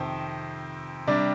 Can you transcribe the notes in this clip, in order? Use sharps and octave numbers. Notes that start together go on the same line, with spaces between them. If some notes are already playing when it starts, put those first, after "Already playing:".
Already playing: F2 C3 D#3 C5
C3 G3 D4 D5